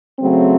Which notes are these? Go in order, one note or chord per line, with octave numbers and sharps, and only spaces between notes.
C#3 F#3 A3 C4